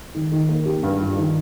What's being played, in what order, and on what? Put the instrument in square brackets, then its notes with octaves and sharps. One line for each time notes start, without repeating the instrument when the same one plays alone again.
[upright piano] D#3
D#3
A#3
G4
G2
F4
D#3